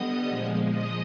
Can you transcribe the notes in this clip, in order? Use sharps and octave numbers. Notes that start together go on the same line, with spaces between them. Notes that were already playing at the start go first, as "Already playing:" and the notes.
Already playing: D3 G3 B3 D#5 D#6
A#2 F3 G#3
D#5 D#6